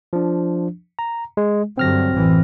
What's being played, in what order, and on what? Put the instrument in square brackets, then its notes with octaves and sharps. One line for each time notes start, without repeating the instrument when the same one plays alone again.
[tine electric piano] F3 D4
A#5
G#3
[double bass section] G2 D3 F#3 [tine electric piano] C4 F6 A#6
[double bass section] A1 F#2 E3